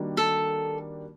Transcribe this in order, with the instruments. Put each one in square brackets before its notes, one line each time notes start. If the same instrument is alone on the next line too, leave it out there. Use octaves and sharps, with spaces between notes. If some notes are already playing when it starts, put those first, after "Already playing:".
Already playing: [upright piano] D#3 G3 A#3 D4 F#4
[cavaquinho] A4